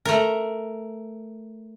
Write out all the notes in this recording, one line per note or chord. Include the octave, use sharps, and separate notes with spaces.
A3 A#4